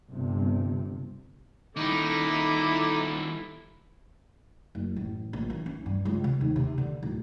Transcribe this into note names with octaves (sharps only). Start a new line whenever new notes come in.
G1 C3
D#3 G3 D#4 E4 A4 D6
F#1
A1
A#1
E3
C#4
G2
C#2
C3
D#2
C3
D3
D1